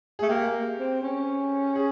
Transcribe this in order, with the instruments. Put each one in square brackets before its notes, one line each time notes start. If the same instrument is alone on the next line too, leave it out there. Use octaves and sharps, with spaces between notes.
[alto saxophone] A3 [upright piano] G#4
[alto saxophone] A#3 [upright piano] G4
[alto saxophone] C4
C#4
[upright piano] G#4